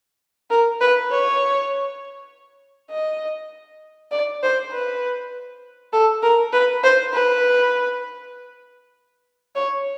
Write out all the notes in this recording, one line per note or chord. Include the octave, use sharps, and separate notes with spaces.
A#4
B4
C#5
D#5
D5
C5
B4
A4
A#4
B4
C5
B4
C#5